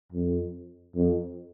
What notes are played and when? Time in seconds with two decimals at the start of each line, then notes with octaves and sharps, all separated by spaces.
0.12 F2
0.96 F2